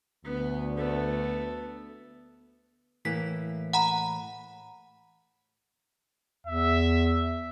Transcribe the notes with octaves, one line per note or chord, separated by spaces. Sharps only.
D2 B3
A3 B3
A2 E3 A#3 B6
F#5 A#5 B5
E2 E5